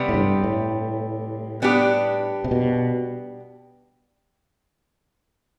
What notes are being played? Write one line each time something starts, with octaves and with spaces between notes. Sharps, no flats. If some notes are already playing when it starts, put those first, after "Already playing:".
Already playing: C3 G3 B3
A2
G2
A2
G3 B3 D4 G4
C3
B2